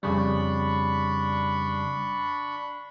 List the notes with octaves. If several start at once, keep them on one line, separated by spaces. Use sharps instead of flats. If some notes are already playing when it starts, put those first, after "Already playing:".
F2 C#3 G3 D4 B5 C#6